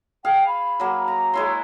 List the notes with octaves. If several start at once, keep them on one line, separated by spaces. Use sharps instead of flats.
G#4 F5 G5
B5
F#3 A#3
A#5
G#3 E4 C#5 C6